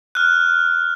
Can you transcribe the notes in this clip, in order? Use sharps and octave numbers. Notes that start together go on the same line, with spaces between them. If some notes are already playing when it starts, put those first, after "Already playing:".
F6 F#6